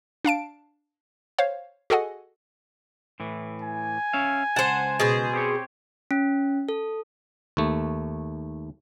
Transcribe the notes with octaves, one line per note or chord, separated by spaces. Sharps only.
D4 F5 A5 D7
C5 C#5 F5
F#4 G#4 A4 D#5 F#5 G#5
A2 E3
G#5
C#4 E5 F5
C#2 F#2 C5 F#5 A5
B2 G#4 C5
C4 G4 C#5
C#4
A4
D#2 A3